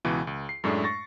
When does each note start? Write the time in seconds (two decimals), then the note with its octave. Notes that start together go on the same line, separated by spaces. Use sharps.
0.05 C#2 B2 E3
0.27 C#2
0.49 C7
0.64 F#2 A2 G#3 A3 D4
0.84 C#6 A6 A#6